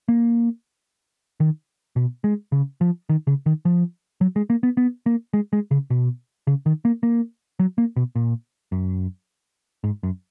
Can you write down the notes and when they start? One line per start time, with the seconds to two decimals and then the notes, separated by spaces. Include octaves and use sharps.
0.08 A#3
1.40 D#3
1.96 B2
2.24 G#3
2.52 C#3
2.81 F3
3.09 D#3
3.27 C#3
3.46 D#3
3.65 F3
4.21 F#3
4.36 G#3
4.50 A#3
4.63 B3
4.77 B3
5.06 A#3
5.34 G#3
5.53 G#3
5.71 C#3
5.90 B2
6.47 C#3
6.66 D#3
6.85 A#3
7.03 A#3
7.59 F#3
7.78 A#3
7.96 B2
8.16 A#2
8.72 F#2
9.84 G#2
10.03 F#2